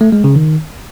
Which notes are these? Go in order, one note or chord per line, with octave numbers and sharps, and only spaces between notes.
A3
G#3
C#3
D#3